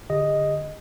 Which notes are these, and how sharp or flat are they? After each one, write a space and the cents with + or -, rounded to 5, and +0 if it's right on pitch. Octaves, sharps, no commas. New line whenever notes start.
D3 +0 G4 +40 D#5 +0